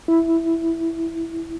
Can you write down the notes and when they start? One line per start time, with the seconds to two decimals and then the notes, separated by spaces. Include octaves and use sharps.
0.08 E4